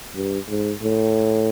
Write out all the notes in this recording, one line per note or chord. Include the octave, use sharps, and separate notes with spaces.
G2
G#2
A2